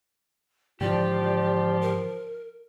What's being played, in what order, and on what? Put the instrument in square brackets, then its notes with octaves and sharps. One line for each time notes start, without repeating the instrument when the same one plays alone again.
[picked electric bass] G#2 D3 E3 [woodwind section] F3 F4 [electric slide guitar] G4 [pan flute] D5
[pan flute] A#4